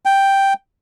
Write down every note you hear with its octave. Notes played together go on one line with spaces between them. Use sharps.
G5